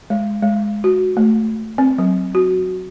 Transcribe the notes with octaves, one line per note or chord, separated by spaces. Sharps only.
G#3
G#3
F#4
A3
C4
F#3
F#4